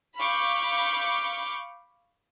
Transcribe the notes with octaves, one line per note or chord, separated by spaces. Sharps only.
F5 B5 C#6 D6 G6